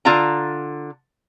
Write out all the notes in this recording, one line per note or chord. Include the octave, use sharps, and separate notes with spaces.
D3 F4 F5 A5 A#5